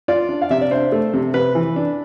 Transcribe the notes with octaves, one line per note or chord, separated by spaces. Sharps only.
F4 D5
D4
F5
C3 E5
D5
D4 C5
A3
C3
C3 B4
E3
D4